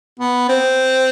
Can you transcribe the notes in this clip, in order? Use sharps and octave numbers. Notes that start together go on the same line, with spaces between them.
B3
C4